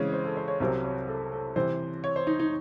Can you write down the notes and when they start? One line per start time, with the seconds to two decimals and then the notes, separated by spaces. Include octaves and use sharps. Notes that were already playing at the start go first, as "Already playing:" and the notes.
Already playing: C#3 E3 G#3 C4 C#5
0.13 C5
0.25 A4
0.37 C5
0.48 C#5
0.60 C2 C3 F#3 C4 C#5
0.84 C#5
1.08 A4
1.32 A4
1.56 C3 E3 C4 C5
2.04 C#5
2.16 C5
2.27 D#4
2.39 D#4